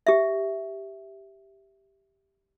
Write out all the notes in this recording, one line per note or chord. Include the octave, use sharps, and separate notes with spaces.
G4 E5